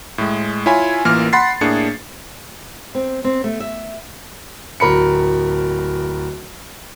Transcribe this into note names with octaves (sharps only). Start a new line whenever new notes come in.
A2 G#3
E4 F4 C#5 G#5 B5
A1 E3 A#3 F4 A#4 F6
F#5 B5 C6 A6 C7
A2 A#3 D4 G#4 C#7
C4
C4
A3
E5
D1 A#4 B5 C#7